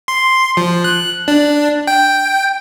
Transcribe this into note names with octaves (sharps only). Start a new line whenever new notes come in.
C6
F3
F#6
D4
G5